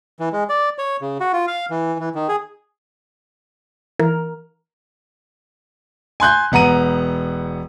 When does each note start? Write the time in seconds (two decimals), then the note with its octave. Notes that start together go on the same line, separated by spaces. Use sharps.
0.20 E3
0.33 G#3
0.49 D5
0.78 C#5
1.01 C#3
1.20 F#4
1.33 F4
1.47 F5
1.70 E3
2.00 E3
2.15 D#3
2.28 G#4
4.00 E3 A#4
6.20 G#5 C6 F#6 G6
6.52 E1 B3 F#5 A#5 D#7